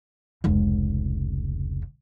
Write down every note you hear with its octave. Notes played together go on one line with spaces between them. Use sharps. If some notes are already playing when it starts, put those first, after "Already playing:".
F1 C#2